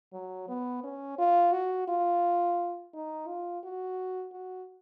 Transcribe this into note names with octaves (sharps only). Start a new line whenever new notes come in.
F#3
B3
C#4
F4
F#4
F4
D#4
F4
F#4
F#4